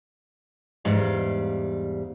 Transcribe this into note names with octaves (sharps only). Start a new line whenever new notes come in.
E2 G#2 G3 F5